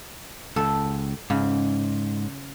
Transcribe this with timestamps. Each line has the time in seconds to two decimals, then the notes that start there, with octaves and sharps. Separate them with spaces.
0.56 C#2 A4
1.30 G#2 C#3